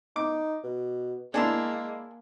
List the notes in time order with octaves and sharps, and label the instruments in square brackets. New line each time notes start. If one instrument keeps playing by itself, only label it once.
[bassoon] D#4 [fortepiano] D6
[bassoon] B2
[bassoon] G#3 [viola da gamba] A#3 [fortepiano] D4 E4 [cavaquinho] G#4 A5 C6